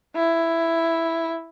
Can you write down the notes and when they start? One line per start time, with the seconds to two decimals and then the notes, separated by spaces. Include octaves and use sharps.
0.16 E4